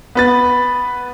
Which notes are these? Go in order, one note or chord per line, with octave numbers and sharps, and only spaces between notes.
B3 B4 A6